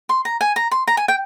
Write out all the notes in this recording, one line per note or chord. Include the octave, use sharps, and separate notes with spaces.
C6
A#5
G#5
A#5
C6
A#5
G#5
G5